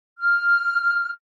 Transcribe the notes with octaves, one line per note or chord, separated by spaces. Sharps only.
F6